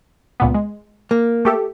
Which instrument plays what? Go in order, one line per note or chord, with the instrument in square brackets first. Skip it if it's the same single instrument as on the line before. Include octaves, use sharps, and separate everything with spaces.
[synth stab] C#2 A#2 B3
G#3
[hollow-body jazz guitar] A#3
[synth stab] A3 G4 A4